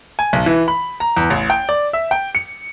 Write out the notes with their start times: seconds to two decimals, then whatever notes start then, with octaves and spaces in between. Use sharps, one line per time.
0.19 G#5
0.33 B1
0.46 E3
0.68 B5
1.00 A#5
1.17 E2
1.30 A1
1.50 G5
1.69 D5
1.93 E5
2.11 G5
2.35 C#7